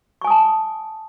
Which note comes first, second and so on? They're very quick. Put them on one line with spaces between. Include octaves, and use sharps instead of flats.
C#6 G#5 D#6 A5